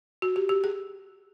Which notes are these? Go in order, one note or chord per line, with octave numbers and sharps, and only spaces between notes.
F#4
G4
G4
G#4